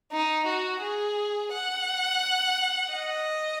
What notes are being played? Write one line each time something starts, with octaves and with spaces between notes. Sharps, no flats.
D#4
F#4
G#4
F#5
D#5